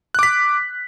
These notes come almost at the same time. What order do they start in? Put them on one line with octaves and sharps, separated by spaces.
F#6 D6 B6